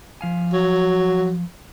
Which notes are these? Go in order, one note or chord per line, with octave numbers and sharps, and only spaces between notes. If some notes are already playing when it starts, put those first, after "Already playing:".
F3 F5 G#5
F#3